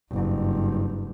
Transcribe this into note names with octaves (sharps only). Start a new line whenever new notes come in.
F#1 G2